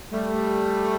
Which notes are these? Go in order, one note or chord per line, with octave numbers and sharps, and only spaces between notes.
G3 A3